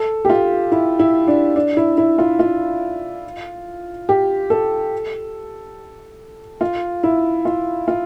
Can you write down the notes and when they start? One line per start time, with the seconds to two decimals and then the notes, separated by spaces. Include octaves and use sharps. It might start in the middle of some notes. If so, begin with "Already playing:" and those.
Already playing: A4
0.25 G4
0.30 F4
0.72 E4
0.99 E4
1.27 D4
1.56 D4
1.77 E4
1.98 E4
2.18 F4
2.39 F4
4.09 G4
4.50 A4
6.61 F4
7.03 E4
7.45 F4
7.88 F4